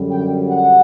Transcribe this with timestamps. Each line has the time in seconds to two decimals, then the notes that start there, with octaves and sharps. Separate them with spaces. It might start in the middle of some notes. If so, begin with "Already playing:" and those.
Already playing: F#2 D3 G3
0.12 G5
0.49 F#5